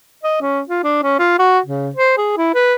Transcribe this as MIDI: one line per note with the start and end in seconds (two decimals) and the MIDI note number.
0.23 0.36 75
0.41 0.62 61
0.69 0.82 65
0.84 1.02 62
1.03 1.18 61
1.19 1.36 65
1.39 1.59 66
1.66 1.90 49
1.95 2.15 72
2.17 2.35 68
2.37 2.51 64
2.55 2.76 71